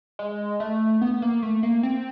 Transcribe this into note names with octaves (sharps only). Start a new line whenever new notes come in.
G#3
A3
B3
A#3
A3
A#3
C4